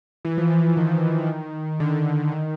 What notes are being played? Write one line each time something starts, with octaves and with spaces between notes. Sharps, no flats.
E3
F3
E3
D#3
D3
D#3